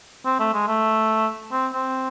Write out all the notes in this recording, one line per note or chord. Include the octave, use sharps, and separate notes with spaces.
C4
A3
G#3
A3
C4
C4